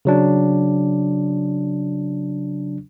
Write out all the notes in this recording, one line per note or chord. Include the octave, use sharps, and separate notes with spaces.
C#3 F#3 D4